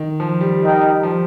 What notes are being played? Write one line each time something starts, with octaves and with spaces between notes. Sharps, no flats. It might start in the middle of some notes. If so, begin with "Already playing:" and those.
Already playing: D#3
F3
G3
D#4 A#4 D#5 G5
F3